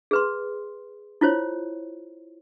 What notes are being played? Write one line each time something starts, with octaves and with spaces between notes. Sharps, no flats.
G#4 B4 C6
E4 F4 C5 C#5